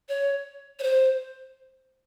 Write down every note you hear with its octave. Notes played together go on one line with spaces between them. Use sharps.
C#5
C#5
C5